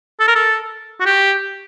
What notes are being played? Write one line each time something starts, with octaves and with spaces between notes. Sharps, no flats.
A4
A#4
A4
F#4
G4